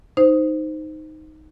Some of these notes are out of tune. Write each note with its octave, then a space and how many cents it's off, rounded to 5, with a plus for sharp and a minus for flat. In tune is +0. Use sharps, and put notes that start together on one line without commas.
D#4 +0 C5 -10